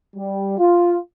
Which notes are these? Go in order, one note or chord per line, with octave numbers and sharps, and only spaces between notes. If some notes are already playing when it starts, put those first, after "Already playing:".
G3
F4